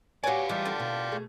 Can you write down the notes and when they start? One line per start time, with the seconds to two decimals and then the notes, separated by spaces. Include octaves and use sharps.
0.24 F#4 G4 B4 C#5 D5 F5 G#5
0.49 E3 G3 G#3 F4 G4 A5
0.65 D3
0.79 B2
1.12 B2 A3 G#4